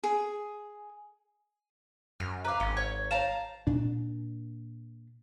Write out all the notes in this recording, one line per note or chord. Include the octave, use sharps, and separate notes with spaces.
G#4
F#2 F6
B4 F5 A#5 D6
G#1 C#4
C#5 G#6
C#5 F5 A5 A#5 E7
A#2 D4